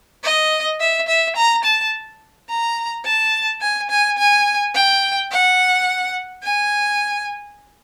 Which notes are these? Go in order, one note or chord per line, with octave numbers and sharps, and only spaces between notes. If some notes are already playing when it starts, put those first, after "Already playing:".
D#5
E5
E5
A#5
A5
A#5
A5
G#5
G#5
G#5
G5
F#5
G#5